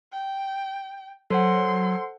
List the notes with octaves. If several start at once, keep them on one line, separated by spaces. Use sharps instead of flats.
G5
F#3 A4 C5 F#5 C6